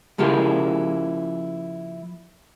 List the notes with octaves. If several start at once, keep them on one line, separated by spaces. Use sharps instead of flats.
C#3 F3 A#3 E4 G4 G#4